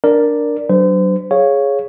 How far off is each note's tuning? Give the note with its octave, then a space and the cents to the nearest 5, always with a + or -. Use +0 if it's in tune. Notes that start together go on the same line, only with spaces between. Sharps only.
D4 +0 A#4 +0 D5 +0
F#3 +25 D4 +0 C5 -35
G#4 +0 C#5 +0 F5 +0